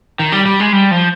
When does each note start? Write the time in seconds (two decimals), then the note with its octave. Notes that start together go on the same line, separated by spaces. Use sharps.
0.19 D#3
0.32 G3
0.46 G3
0.60 G#3
0.73 G3
0.91 F3